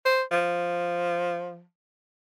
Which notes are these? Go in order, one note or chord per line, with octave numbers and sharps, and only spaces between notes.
C5
F3